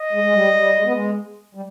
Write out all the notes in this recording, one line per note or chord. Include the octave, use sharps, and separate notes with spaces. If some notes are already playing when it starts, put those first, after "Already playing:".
Already playing: D#5
G#3
G#3
G3
G3
G#3
B3
G#3
G3